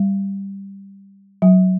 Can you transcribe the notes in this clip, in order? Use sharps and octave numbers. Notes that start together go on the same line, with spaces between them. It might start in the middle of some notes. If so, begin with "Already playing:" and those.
Already playing: G3
F#3